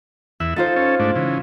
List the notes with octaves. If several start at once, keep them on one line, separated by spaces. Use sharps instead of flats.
E2 E5 F#6
D#4 F4 A4 C5
C#4 A4
G#2 A3 D4
C#3 E3